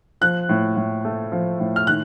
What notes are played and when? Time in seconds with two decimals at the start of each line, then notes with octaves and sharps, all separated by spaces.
0.21 F3 F#6
0.49 A2
0.76 A2
1.05 A3
1.32 F3
1.60 A2
1.76 F6
1.87 D#3 F#6